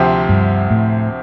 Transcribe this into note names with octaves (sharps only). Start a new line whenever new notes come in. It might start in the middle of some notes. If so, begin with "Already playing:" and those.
Already playing: D2 C3 F3 C4 G4
G2
A2